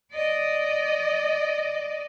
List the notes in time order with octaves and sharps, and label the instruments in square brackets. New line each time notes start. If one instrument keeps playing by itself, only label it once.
[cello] D5 D#5